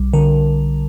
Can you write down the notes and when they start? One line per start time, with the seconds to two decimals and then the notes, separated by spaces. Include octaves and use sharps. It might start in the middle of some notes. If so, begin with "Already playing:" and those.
Already playing: B1 G3
0.13 D3 A#4